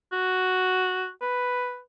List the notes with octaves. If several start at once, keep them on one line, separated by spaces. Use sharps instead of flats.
F#4
B4